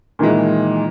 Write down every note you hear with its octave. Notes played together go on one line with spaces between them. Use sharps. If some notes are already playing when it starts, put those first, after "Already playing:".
A#2 D#3 E3 G#3